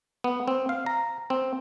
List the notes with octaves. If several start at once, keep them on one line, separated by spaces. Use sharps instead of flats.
B3
C4
F5
A#5
C4